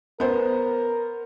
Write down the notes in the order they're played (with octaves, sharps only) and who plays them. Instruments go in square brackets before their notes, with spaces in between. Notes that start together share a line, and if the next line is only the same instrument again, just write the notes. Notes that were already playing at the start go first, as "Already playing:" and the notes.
[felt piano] B3 C5 [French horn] A#4